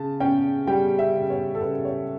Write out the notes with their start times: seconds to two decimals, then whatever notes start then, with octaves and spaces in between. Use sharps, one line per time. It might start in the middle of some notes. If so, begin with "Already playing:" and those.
Already playing: C#3 A5
0.20 C#4 G5
0.67 G3 G5
0.99 E5
1.15 C#3
1.30 C#5
1.55 A4
1.61 C#3 B4
1.85 C#5